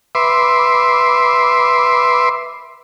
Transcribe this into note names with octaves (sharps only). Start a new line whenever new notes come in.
B4 E5 C6 D6